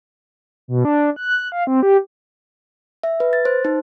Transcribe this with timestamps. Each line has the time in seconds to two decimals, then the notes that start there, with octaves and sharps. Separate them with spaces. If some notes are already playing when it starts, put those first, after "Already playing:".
0.68 B2
0.85 D4
1.16 F#6
1.52 F5
1.67 C4
1.83 G4
3.03 E5
3.20 B4
3.33 A6
3.45 C5
3.65 D#4